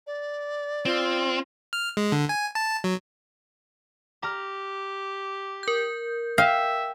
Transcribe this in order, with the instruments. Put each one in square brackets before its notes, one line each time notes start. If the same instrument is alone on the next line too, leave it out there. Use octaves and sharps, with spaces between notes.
[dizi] D5
[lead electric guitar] C4 [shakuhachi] F4
[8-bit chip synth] F6
G#3
D3
G#5
A5
F#3
[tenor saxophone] G4 [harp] A#5 F6
[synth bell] A#4 G6
[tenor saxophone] E5 [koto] F5 [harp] G5